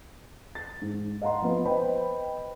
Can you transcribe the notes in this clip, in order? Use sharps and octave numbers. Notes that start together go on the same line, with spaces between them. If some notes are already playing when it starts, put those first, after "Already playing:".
A6
G#2
D#5 F5 F#5 A#5 C6
F3 B3
B4 C5 D#5 G5 B5